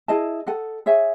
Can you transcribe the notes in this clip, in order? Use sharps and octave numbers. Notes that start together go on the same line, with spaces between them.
E4 G#4 D#5 A5
A4 D#5 F#5
G#4 C#5 E5 G#5